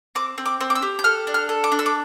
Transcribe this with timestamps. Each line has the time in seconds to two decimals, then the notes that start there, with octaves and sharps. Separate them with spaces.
0.15 C4 D6
0.38 C4
0.46 D6
0.61 C4
0.70 D6
0.75 E6
0.82 G4
0.99 G6
1.04 A4 F6
1.27 D4
1.34 F6
1.49 A4
1.64 D6
1.72 D4
1.79 E6
1.86 D6